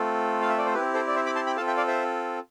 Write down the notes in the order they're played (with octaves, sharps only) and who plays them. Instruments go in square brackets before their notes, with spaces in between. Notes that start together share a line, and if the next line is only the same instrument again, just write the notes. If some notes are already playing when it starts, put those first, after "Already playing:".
Already playing: [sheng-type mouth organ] A3 C4 F4 A4
F5
E5
D5
C5
C4 E4 G4 B4
A4 C5
D5
C5 E5
B5 D6
A5 C6
G5 B5
C4 F4 A4 F5 A5
E5 G5
D5 F5
C5 E5